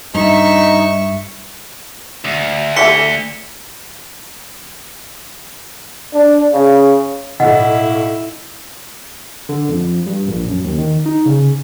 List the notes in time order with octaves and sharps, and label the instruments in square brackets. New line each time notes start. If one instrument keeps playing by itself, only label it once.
[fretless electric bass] G2 [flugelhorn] D#4 [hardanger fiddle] E5 C#6
[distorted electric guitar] D2
[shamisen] E3 A3 A4 [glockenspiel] B6 C#7 G7
[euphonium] D4
C#3
[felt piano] B1 A2 [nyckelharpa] E4 [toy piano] D#5 [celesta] F#5
[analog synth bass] D3
F2
G2
A#1
F#2
D#2
D#3
D#4
C#3